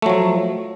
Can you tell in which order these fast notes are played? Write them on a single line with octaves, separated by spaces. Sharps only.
A3 F#3 F3